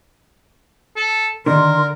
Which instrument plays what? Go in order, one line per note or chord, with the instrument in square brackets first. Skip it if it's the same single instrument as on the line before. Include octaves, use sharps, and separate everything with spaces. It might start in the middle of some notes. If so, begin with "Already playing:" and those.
[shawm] A4
[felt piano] D3 [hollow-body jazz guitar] D#3 [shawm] A#4 [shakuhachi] C6